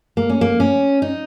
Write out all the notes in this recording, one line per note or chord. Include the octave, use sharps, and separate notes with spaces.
A#3
C#4
A#3
C#4
D#4